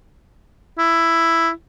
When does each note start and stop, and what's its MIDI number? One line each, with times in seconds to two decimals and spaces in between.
0.78 1.50 64